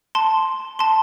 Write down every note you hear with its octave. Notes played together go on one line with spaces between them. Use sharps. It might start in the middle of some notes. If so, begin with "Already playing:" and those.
A5 C6
A5 C6